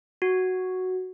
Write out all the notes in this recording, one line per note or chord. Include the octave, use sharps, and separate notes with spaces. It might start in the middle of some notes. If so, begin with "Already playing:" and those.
F#4